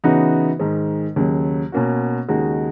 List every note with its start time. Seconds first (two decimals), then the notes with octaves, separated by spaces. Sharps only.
0.04 C#3 E3 B3 D#4 F#4
0.59 G#2 D#3 G#3
1.16 D#2 C#3 F#3
1.72 B2 A#3 C#4 F#4
2.28 D#2 C#3 G#3 D#4 F#4